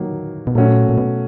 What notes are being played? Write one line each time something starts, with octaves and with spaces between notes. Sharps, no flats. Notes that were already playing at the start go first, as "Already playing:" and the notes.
Already playing: D#3 F#3 A#3
B2
A#2 F#3 A3 C#4 F#4
A#2
B2